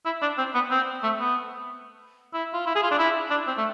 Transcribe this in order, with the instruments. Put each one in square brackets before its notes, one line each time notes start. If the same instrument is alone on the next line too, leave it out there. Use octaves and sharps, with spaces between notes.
[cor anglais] E4
D4
C4
B3
C4
A3
B3
E4
F4
E4
G#4
F4
D4
E4
D4
C4
A3